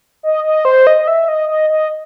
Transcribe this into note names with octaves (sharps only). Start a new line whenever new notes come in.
D#5
D#5
C5
D#5
E5
D#5
D#5
D#5